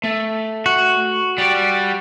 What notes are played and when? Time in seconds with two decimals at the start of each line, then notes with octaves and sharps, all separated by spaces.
0.04 A3
0.66 F#4
1.38 G3 D5